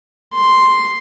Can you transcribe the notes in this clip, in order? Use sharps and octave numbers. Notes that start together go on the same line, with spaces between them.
C6